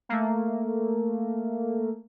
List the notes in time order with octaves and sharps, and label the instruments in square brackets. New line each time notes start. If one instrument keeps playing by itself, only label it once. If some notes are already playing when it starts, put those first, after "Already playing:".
[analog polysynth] A3 A#3